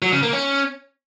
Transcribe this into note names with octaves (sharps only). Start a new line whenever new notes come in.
F#3
C#3
A#3
C#4